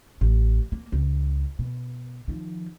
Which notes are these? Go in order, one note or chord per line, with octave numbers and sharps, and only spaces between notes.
A1
A#3
C#2
B2
D#3 F3